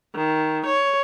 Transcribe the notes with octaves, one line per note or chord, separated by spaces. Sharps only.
D#3
C#5